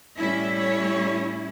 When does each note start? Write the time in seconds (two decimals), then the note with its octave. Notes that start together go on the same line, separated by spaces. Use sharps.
0.17 A2 G3 C#4 E4 E5
0.58 C#5